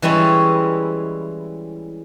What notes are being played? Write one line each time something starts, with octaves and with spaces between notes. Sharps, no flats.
E3 G3 G#3 C#4 E4